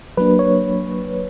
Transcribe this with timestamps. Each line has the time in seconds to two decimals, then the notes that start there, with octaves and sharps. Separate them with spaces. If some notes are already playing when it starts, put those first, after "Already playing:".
0.17 F#3 A#3 D4 B4
0.39 C#5